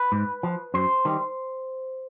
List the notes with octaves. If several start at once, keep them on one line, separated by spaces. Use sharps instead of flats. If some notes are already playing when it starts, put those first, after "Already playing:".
Already playing: B4
G#2
F3
F#2 C5
D#3 G3